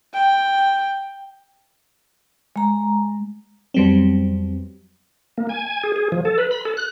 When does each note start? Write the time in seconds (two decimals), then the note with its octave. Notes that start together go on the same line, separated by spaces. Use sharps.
0.13 G5
2.56 G#3 A#5
3.74 F2 F#3 G3 B3 C4
5.38 A#3
5.49 G#5
5.66 G#5
5.83 G#4
5.96 G#4
6.12 F3
6.25 A4
6.38 B4
6.51 B5
6.65 A4
6.77 F#6